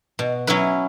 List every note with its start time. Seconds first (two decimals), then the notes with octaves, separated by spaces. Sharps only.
0.19 B2
0.47 F#3 C#4 E4 B4